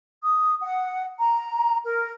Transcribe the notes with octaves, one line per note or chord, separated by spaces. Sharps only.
D#6
F#5
A#5
A#4